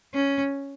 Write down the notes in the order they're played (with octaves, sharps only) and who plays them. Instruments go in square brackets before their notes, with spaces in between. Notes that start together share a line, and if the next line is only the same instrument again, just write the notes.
[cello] C#4